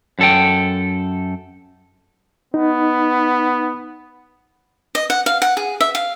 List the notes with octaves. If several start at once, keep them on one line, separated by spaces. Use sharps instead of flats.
F#2 A4 G5
B3 D#4
D#5
F#5
F5
F#5
G#4
E5
F5